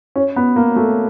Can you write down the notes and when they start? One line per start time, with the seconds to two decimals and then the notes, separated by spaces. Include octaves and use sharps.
0.16 C#4
0.36 B3
0.56 A#3
0.76 A3